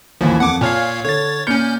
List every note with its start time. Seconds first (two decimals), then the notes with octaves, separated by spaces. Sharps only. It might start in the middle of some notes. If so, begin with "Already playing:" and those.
0.21 A1 D#2 E3 F3
0.40 F2 F#5 D6
0.61 A#2 C#5 F5 G#5 F6
1.04 D3 C#5 A6
1.47 A#2 C#4 F6 G6 C#7